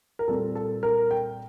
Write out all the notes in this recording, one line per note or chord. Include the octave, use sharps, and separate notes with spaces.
A#4
A#2 G3 C4 A4
A4
A#4
G5